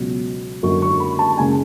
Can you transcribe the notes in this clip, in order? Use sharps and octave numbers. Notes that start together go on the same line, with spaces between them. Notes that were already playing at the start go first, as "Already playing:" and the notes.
Already playing: C#2 B2 F#3
F#1 F#2 D3 F#3 C#6
C#6
B5
A5
F#1 C#3 G#3 G#5